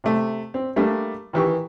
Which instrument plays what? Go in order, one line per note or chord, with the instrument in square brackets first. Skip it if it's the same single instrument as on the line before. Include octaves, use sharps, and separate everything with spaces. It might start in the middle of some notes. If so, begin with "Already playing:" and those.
[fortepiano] C3 A3
C4
G3 A3 A#3 D4
D#3 E3 G4 C#6